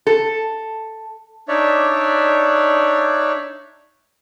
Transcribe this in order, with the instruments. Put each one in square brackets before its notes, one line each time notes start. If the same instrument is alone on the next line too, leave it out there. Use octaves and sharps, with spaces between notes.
[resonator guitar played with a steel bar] A4
[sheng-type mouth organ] D4 D#4 C#5 D5 E5